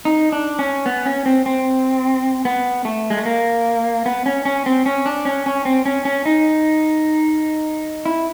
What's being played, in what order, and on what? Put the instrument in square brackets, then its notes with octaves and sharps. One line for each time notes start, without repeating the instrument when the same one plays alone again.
[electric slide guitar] D#4
D4
C#4
B3
C#4
C4
C4
B3
A3
G#3
A3
A#3
B3
C#4
C#4
C4
C#4
D4
C#4
C#4
C4
C#4
C#4
D#4
E4